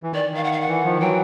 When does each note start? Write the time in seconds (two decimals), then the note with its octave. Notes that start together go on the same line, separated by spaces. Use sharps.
0.03 E3
0.13 D#3 D5
0.31 D#3 F5
0.44 F#5
0.52 F5
0.60 F#5
0.68 E3
0.84 D#3 F3
0.99 E3 F#3 G5